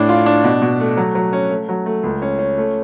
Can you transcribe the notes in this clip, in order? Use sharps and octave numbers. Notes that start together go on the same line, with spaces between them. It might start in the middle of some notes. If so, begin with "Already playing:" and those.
Already playing: A2 D4
F4
D4
B2
B2
A3
F#3
F#3
C#4
A3
F#3
A3
C#2
C#4
C#4
A3